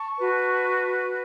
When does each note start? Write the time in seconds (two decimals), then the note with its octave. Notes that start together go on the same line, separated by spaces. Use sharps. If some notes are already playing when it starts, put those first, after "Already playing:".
Already playing: A5 C#6
0.17 F#4 B4